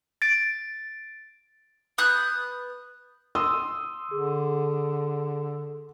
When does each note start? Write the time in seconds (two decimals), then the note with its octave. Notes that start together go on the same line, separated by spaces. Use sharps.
0.22 A6 D7
1.98 B3 D#6 F#6 G6
3.35 C6 D#6 E6 G7
4.11 D3 G#4